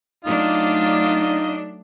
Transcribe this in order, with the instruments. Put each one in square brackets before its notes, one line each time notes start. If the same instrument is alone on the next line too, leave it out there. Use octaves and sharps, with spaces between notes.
[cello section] F#3 A3 D4 [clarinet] D#4 [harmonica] F4 D#5